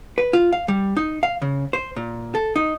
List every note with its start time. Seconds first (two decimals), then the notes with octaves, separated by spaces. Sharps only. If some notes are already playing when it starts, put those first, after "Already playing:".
0.18 B4
0.33 F4
0.53 F5
0.68 G3
0.97 D#4
1.23 F5
1.42 C#3
1.73 C5
1.96 A#2
2.35 A4
2.56 D#4